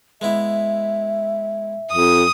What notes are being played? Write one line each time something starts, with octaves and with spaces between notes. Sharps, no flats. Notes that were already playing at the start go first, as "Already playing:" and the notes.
G#3 B3 E4 E5
F2 D#6